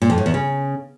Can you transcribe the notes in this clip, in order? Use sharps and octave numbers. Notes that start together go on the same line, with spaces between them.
A#2
F2
A2
E2
C#3